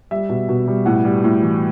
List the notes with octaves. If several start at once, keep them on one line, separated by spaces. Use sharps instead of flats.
G3 E5
B2
B2
G3
A2 F#5
G3
A2
E3